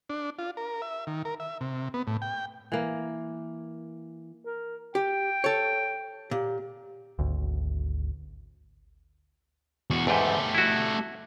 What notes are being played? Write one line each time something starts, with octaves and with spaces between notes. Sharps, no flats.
D4
F4
A#4
E5
D#3
A#4
E5
C3
B3
A2
G5
E3 A#3
A#4
G4 G5
A4 C#5
A#2 G4
G#1 D2
E2 F#4
E2 G#2 A3 G4
E4 F#4